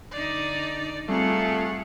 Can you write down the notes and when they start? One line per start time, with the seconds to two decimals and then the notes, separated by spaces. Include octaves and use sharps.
0.11 D3 D#4 D5
1.09 G3 A3 C4 F4 G#4 F#5 A#5